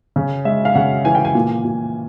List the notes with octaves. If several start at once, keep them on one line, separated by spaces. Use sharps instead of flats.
C#3
G#3 E5
F5
C#3 F#5
E3 G#5
G5
G#5
A#2
A#2